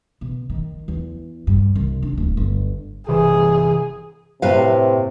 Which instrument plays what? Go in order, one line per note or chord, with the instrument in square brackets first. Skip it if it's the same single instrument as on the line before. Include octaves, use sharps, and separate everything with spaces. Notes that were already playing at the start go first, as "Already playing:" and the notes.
[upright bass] B2
D#3
E2
G2
C2
D4
D1
G1
[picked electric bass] G1 C3 E3 [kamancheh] G#4
[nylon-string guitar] A2 B4 F5 [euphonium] C3